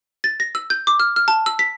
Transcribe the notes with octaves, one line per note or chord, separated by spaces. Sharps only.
A6
A#6
E6
G6
D6
F6
F6
A5
E6
B6